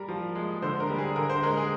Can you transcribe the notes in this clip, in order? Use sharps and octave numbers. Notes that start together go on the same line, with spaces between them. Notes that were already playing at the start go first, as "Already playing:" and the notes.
Already playing: G3 A#4
F3
G#3
D3 C5
A#4
G3
G#4
D3 A#4
C5
G#3 A#4
G#4